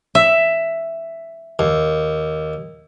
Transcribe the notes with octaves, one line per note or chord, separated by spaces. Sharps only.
E5
D#2